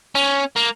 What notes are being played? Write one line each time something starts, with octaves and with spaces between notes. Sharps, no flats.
C#4
A#3